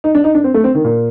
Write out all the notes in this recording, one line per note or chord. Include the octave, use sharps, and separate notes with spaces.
D#4
D4
D#4
D4
C4
A3
C4
D#3
A#2